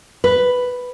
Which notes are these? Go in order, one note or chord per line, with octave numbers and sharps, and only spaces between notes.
B4